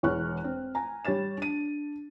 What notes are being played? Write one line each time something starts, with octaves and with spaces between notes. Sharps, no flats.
E1 E2 C#5 C#6 F6 F#6
C4
G#5 A#5
G3 G4 C#5 A6 E7
D4 D#7